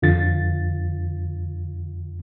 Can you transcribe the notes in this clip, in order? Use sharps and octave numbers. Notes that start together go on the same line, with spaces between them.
F2 D3 F4 A6